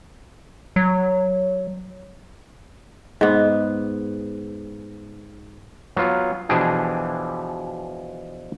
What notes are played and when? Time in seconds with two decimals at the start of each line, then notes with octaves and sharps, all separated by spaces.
0.76 F#3
3.21 G#2 B3
5.96 F#3 B3 F4
6.49 B2 E3 F3 D4 G4 G#4